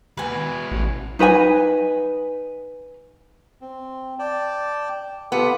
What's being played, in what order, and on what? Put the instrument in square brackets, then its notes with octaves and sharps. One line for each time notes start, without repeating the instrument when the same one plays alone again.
[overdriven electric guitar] D#2 [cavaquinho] B4 G#5
[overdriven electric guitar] B2 E4
[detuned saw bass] A1
[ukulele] D#4 B4 D#5 G#5
[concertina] C4
D5 G5 A5
[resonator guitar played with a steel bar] B3 [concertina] F4 G4 A4